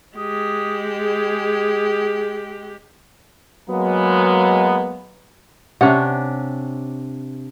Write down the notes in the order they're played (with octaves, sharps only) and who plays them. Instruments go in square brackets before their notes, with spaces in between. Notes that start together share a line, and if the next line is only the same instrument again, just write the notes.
[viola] G#3 G4 [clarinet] D#6
[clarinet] G#4
[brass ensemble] F#3 G#3 A#3 B3
[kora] C3 D4 [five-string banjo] C#4 F#5